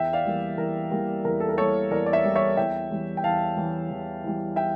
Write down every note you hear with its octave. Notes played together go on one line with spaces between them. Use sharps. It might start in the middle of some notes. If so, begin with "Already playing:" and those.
Already playing: E2 E5 G5
D5 F5
E3 G3 A#3
E2 A#4
E3 G3 A#3
E2 A#4
A4
A#4
E3 G3 A#3 A4 C#5
E2 A#4 D5
D5
C#5 E5
E3 G3 A#3
C#5 E5
E2 E5 G5
E3 G3
G5
E2 F5 A5
E3 G3
E2
E3 G3
E5 G5